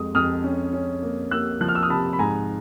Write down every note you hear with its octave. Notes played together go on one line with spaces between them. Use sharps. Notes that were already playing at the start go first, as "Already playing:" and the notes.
Already playing: F2 G#3 D#6
F2 D#6 F6
C#4
C#4
A#3
A#3 E6 F#6
F3 F#6
F6
E6
D#6 F6
C3 A5 B5
B5
G#2 G#5 A#5